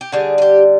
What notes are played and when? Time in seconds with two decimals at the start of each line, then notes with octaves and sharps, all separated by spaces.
0.01 G4
0.12 D3 G3 G#4
0.38 G#4
0.42 G4